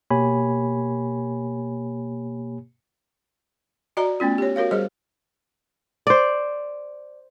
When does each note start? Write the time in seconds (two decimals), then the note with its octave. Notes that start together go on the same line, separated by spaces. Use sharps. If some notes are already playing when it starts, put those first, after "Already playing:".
0.11 B2 A#3 G4 C#5 G#5 B5
3.97 F#4 D5 D#5 A#5
4.20 A3 B3 C#4 F4
4.38 G4 C#5
4.56 F#4 A#4 C#5 F5
4.71 G3 G#4 C5 D#5
6.07 C5 D5